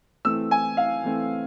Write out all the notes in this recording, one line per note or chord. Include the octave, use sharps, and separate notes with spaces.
E3 A3 C4 E6
G#5
F5
E3 A3 C4